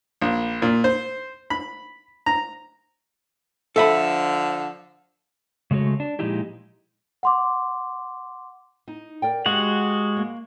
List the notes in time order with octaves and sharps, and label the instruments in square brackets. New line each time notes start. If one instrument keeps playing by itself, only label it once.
[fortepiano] A#1
A#2
C5
B5
A#5
[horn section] D3 F3 [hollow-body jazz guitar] A4 E5 B5
[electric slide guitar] C#3 G#3 A3 F#4 C#5
D4
A#2 F3 G#3 D#4 E4 G4
[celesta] F#5 C6 D6
[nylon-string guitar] D#4
A#4 D5 G5
[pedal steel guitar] G#3 F#4 F#5 [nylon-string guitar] G4 F5
[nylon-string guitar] A#3